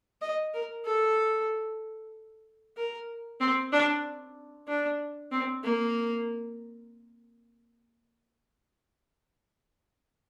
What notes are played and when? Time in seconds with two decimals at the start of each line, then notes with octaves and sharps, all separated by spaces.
0.22 D#5
0.54 A#4
0.85 A4
2.77 A#4
3.40 C4
3.72 D4
4.68 D4
5.32 C4
5.64 A#3